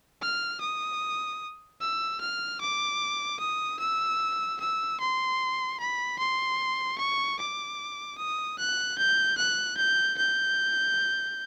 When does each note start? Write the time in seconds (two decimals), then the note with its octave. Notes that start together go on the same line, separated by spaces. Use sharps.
0.22 F6
0.61 D#6
1.81 E6
2.21 F6
2.61 D6
3.40 D#6
3.80 E6
4.60 E6
5.00 C6
5.80 B5
6.19 C6
6.98 C#6
7.39 D6
8.18 D#6
8.59 F#6
8.98 G6
9.38 F#6
9.77 G6
10.18 G6